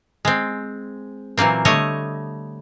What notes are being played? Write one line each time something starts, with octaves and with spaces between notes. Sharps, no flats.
G#3 C4
A#2 E3 F#3 A#3 C4
D3 G3 A3 C#5 D#5